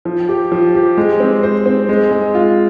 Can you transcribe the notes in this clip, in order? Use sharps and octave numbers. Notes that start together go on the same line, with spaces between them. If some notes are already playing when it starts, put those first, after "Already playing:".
F3
G4
F3
G4
G#3
C4
C5
C4
G#3
G#3
F4